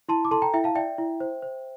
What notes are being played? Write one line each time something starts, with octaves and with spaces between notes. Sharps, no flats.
E4 A5 C6
D6
A4 A5 C6
G5 A#5
E4 E5 G5
F5 A5
D5 E5 G5
E4
C5
C5